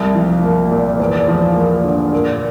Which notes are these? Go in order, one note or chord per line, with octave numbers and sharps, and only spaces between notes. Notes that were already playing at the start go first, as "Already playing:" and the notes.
Already playing: C2
F3
A#3
A#2
E2
F3
A#3
D3
A#2